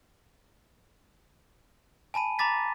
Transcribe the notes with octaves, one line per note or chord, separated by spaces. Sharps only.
G#5 A5 B5 D#7
A#5 B5 D6 A6 B6